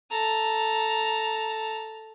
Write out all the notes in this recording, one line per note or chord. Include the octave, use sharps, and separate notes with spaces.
A4 A#5